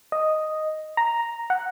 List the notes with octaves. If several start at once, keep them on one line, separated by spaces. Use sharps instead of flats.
D#5
A#5
F#5